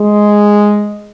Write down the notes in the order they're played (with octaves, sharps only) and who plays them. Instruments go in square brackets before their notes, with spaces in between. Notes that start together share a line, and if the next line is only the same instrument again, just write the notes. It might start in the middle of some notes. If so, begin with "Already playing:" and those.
Already playing: [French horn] G#3